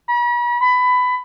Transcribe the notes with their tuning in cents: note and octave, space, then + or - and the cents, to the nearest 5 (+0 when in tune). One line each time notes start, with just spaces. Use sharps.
B5 -45
B5 +20